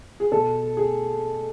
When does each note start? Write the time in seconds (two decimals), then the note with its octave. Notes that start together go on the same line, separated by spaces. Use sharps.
0.20 G#4
0.32 B2 A4
0.77 G#4